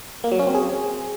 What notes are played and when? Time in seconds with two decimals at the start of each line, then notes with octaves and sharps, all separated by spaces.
0.24 A#3
0.32 F#3
0.39 C#4
0.47 C4
0.55 G#4